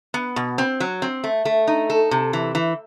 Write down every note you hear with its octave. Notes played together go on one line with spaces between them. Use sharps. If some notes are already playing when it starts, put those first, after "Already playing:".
B3
B2
C4
F#3
C4
A3
A3
D#4
A4
C3
E3
E3